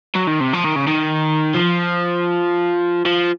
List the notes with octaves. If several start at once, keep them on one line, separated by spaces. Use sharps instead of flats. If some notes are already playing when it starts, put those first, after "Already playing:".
F#3
D#3
C3
F3
D#3
C#3
D#3
F3
F3